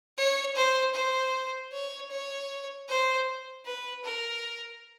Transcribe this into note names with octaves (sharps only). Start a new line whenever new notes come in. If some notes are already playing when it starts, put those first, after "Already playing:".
C#5
C5
C5
C#5
C#5
C5
B4
A#4